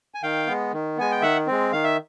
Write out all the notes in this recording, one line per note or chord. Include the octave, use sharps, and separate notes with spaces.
G#5
D#3 F5 G5
G#3 B3
D#3
G#3 B3 G#5
G5
D#3 E5 F#5
G#3 C4
D#3 F5
E5